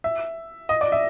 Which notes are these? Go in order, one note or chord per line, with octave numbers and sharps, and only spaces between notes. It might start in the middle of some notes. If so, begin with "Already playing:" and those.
E5
D#5
D5
E5